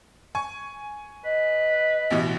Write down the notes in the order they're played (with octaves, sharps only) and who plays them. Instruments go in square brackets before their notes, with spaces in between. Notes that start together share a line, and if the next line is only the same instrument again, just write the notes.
[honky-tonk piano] G#5 C#6
[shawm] B4 [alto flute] D#5
[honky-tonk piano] A1 B2 E3